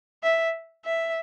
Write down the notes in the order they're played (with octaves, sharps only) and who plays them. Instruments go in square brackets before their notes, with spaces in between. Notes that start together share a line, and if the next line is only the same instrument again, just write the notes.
[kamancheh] E5
E5